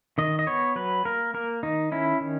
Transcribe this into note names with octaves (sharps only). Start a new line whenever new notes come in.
D#3 D#5
D#5
B3 C#5
F#3 B4
A#3 A#4
A#3 A#4
D#3 D#4
C#4 E4
D#3